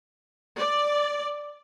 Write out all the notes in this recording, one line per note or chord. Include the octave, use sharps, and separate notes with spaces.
D5